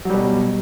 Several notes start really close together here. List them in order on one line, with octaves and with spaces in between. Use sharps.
F#3 G3 B2